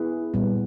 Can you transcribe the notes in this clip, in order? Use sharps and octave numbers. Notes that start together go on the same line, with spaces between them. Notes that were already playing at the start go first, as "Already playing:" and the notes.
Already playing: B3 E4 G#4 B4
A#2 G3 B3